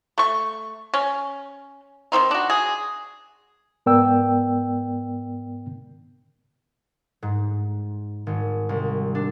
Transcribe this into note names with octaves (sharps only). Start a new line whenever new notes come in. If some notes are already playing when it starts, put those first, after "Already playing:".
A3 C#6
C#4
D#3 F3 C4 D#4
D4 F#4
G#4
G#2 B3 A#4 D5 G5 E6
G#2
G#1
C2
D4